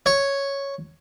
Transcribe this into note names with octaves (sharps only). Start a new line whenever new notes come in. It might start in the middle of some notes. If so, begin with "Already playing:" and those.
C#5